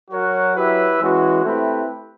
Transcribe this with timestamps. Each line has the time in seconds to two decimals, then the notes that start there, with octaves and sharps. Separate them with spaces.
0.11 F#3 F#4 A#4 C#5 F#5
0.56 E4 G4 B4 E5
1.00 E3 G#3 C#4 F#4
1.44 A3 C4 E4 G4 B4